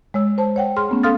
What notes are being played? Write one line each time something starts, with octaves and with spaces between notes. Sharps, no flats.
G#3 C#5 E6
C5 A5
C#5 F#5 G5
G#4 C6 F6
A3 B3 C#4
A4 F5 C6 D#6 F6 A6